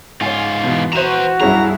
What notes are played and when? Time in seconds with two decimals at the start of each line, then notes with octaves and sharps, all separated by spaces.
0.21 G#2 F4 C#5 G#5
0.64 B2 E3
0.93 F#4 B4 C5 A#5 D#7 E7
1.41 B1 G2 C#4 E4 G#4 A#5